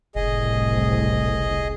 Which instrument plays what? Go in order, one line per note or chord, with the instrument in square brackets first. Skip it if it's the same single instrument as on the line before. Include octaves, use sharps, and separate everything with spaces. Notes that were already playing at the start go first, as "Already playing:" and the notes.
[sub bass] F#1 [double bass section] C2 A2 [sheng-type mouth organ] G#4 D#5